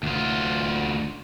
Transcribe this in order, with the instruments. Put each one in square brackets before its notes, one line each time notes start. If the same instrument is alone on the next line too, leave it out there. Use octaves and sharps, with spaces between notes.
[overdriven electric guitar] D2 F4